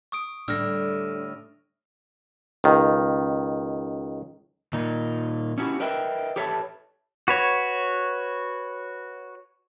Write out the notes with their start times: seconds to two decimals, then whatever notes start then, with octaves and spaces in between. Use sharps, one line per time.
0.12 C#6 D#6 D7
0.48 A2 D3 G3 D4 E6 F6 A#6
2.64 C#2 D#3
4.73 A#2 D#3 D#4
5.58 C#4 E4 F#4 G4
5.80 A#4 B4 D#5 E5 G5
6.36 G4 A4 B4 C#5 E5 A5
7.28 F#4 B4 C#5